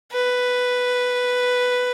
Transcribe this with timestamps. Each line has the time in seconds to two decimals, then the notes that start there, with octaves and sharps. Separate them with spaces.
0.12 B4